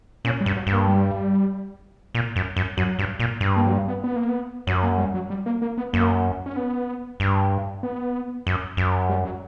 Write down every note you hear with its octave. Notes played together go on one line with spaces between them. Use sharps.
A#2 C#4
G3
G2
F#3
G2
A#3
G3
A#2
F#2
F#2
F#2 F#3
G2
A#2
G2
A#3
F#3
G3
B3
B3
A#3
B3
F#2 F#3
A#3
G3
F#3
G3
A#3
A#3
B3
F#2 A#3
C#4
B3
G2
B3
F#2
F#2
G3
F#3